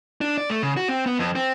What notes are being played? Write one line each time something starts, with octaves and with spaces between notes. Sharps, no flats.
D4
D5
A3
C#3
F#4
C4
B3
F2
C4